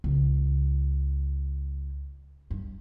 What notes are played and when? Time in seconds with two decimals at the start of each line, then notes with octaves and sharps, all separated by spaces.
0.04 C#2
2.51 G2